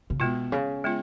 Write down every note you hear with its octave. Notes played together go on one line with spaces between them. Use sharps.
C#3
B2 G#3 B3 F4
C#3
G#3 B3 F4